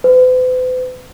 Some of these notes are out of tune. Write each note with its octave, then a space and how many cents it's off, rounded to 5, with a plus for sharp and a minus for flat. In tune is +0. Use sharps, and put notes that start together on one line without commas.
B4 +45